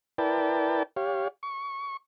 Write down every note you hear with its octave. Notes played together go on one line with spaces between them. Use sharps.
E4 A#4 B4 D5 G5 A5
G4 C#5 F5
C#6